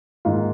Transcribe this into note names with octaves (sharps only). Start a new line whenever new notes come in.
G#2 D#3 A#3 F4